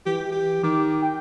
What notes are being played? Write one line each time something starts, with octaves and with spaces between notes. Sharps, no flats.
E3 G4
G4
D#3 D6
G5